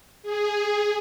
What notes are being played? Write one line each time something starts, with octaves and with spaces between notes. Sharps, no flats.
G#4